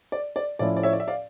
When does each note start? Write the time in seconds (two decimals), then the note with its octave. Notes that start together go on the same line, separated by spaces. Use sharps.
0.12 D5
0.36 D5
0.59 A2 F3 C#4 E4 D5
0.76 D5
0.83 C#5 E5
0.93 D5
1.00 E5
1.07 D5 F5